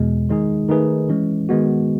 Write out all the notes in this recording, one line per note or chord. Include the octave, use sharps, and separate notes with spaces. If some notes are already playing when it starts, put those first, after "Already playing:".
Already playing: E2 B2 G#3
D#3 G#3 D#4 G#4
D#3 A3 D#4 G#4 B4
E3 G#3 C#4
D#3 G#3 B3 F#4